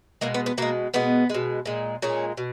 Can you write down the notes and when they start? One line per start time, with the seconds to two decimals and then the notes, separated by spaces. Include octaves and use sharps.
0.21 B2 G#3 A#3
0.34 B3
0.46 B3
0.58 B2 G#3 A#3
0.94 B2 G#3 B3
1.29 B2 G#3
1.65 A#2 G#3
2.02 A#2 G#3 C#4
2.37 B2